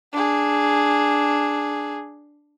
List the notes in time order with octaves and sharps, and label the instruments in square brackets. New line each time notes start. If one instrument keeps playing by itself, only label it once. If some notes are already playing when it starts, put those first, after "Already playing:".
[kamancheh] D4 G#4